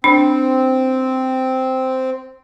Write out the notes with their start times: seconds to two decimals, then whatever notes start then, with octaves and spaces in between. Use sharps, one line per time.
0.04 C4 D4